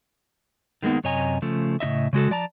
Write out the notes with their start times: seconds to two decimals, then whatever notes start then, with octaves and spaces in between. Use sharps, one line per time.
0.82 D#3 G#3 A#3 B3 D#4
1.04 F#2 C3 C#5 D#5 G#5 A#5
1.42 C#3 F3 A3
1.80 A2 C#3 D#4 D#5 E5
2.13 C#3 G#3 F#4 A4
2.30 F3 D5 A5 A#5